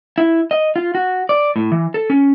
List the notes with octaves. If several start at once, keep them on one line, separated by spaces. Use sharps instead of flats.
E4
D#5
F4
F#4
D5
A2
E3
A4
C#4